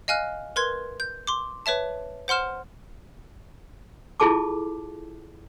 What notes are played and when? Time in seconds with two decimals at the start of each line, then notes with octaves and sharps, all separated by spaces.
0.08 D#5 F5 G#5 F6 F#6
0.56 A#4 B4 C6 G#6
1.00 G6
1.27 C6 D6
1.66 B4 C#5 E5 A5
2.28 C5 F#5 C6 F6 E7
4.20 E4 F4 G#4 A4 A5 D6